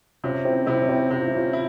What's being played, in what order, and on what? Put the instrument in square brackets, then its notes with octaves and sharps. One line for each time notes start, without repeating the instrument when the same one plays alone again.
[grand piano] C3 [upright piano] C#4 F4
[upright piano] C4 E4
[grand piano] C3 [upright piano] C4 E4
[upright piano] C#4
C4 E4
[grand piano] C3 [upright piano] G4
[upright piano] F4
E4
C#4 F4
[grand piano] E4